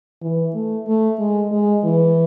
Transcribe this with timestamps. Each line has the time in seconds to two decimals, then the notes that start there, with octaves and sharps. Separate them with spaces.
0.22 E3
0.54 A3
0.87 A3
1.19 G#3
1.52 G#3
1.84 E3